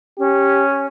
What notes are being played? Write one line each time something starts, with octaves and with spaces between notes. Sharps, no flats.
C#4 G4